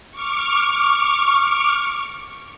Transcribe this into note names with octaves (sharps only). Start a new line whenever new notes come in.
C#6 D6 F6